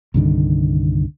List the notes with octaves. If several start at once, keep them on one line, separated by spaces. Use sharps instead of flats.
C2 G2 D3 D#3